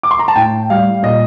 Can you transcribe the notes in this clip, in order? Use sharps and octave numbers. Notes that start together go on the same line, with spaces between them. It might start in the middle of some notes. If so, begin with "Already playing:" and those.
D6
C6
A#5
A5
A2 G5
G3 F5
A#2 D#5